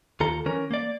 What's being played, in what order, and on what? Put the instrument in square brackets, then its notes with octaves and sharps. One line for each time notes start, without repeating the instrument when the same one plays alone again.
[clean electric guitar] D#2 F4 A4 A#5
E3 C#4 A#4
A#3 D5